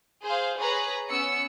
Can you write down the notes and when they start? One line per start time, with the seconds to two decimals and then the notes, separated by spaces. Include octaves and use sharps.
0.24 G#4 C5 F5
0.58 G#4 B4 C#5 A#5
1.10 B3 C#4 E6 C#7